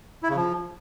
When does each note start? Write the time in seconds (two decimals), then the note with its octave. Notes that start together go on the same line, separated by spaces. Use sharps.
0.23 E4
0.30 C#3
0.36 F3